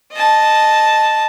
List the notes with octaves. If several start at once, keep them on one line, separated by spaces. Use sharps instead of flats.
D#5 A5